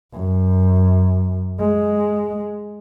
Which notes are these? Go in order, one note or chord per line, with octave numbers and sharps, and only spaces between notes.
F#2
G#3